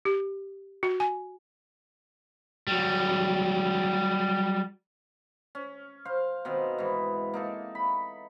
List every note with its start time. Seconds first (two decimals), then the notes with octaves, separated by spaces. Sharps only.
0.05 G4
0.83 F#4
1.00 G#5
2.67 F#3 G3
5.55 C#4
6.05 C5 F5
6.45 B2 D#3 C4
6.78 G#2 E3
7.34 A#3 D#4 A4
7.75 B5